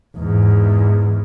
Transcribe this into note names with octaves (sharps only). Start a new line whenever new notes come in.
E2 G#2